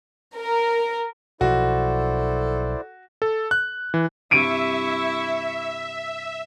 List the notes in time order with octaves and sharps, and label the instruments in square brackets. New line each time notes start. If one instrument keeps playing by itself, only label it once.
[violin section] A#4
[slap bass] B1 F3 [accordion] E4 C5 D5 [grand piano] F#4 [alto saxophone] A4
[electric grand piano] A4
F#6
E3
[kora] G2 C3 F5 [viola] E4 C#6 [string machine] E5 [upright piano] D7 D#7